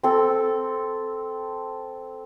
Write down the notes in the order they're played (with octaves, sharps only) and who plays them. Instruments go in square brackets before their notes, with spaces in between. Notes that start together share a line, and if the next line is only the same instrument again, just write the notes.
[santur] C4 A4